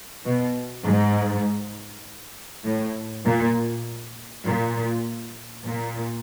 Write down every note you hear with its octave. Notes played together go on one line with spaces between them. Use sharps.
B2
G#2
A2
A#2
A#2
A#2